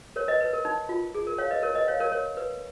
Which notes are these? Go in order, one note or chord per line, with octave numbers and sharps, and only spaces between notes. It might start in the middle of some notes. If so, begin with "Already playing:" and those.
A#4 C#5
B4 D#5
B4
A#4
D#4
F4
G#4
A#4
C#5 F5
B4 D#5
A#4 C#5
B4 D#5
C#5 F5
A#4 C#5
A#4 C#5
B4